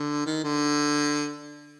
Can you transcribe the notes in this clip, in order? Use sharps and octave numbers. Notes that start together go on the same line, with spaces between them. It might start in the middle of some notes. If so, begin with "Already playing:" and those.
Already playing: D3
D#3
D3